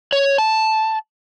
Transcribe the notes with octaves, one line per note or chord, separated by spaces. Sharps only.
C#5
A5